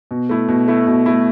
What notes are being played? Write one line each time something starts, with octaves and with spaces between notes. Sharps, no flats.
B2
A3 E4
B2
A3 E4
B2
A3 E4